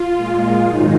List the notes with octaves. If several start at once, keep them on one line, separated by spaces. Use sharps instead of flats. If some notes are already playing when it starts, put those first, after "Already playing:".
Already playing: F4
A#2 G#3
G#2 D#3 F#3 D#4